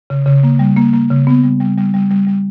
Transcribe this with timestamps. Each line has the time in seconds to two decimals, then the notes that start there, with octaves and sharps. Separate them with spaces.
0.10 C#3
0.26 C#3
0.43 A#3
0.59 G3
0.76 A#3
0.93 A#3
1.10 C#3
1.27 B3
1.44 G3
1.60 G3
1.78 G3
1.94 G3
2.11 G3
2.27 G3